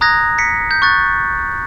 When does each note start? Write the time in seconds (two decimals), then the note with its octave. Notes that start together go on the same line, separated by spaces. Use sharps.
0.01 A#5 D#6 F#6 G#6 A#6
0.38 B6 C#7
0.71 G6
0.82 C#6 F#6 A6